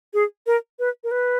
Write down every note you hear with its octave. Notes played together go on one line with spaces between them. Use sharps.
G#4
A#4
B4
A#4
B4